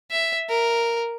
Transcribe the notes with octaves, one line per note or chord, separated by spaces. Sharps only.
E5
A#4